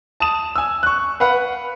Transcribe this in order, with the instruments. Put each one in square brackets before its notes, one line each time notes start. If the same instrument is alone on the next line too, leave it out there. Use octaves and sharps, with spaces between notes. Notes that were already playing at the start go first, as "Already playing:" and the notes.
[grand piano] A5 D#6 E7
G#5 E6
C#6 F#6
B4 F5 F#5 B5